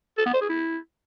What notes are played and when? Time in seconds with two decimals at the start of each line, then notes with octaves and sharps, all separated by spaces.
0.18 A4
0.26 B3
0.34 C5
0.41 G#4
0.49 E4